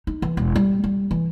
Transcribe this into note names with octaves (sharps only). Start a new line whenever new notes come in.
D#4
E3
E1
G3
G3
E3